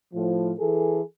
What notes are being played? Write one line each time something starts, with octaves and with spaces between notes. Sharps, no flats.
A2 F3
E3 G#4 A4